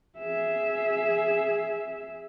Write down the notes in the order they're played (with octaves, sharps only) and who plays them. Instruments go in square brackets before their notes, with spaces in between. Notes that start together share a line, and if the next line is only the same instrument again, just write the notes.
[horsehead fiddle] G#4 E5